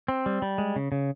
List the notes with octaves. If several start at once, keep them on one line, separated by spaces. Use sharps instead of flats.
C4
G3
G3
G#3
C#3
C#3